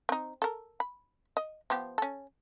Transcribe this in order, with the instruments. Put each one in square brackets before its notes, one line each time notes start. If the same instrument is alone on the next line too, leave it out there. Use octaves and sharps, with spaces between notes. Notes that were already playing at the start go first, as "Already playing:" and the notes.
[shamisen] C4 D#4
A4 A#4
B5
D#5
F3 B3 G4
C#4 A4